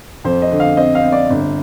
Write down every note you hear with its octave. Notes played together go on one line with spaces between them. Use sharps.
F2 C5
D#5
D3
F5
C4 D#5
F5
C4
D5
G1